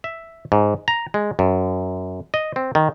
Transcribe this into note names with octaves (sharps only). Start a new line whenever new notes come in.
E5
G#2
A#5
G#3
F#2
D#5
C4
D#3